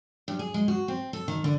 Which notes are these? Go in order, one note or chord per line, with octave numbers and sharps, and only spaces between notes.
G2
G#4
G#3
F#4
C4
A4
D#3
D3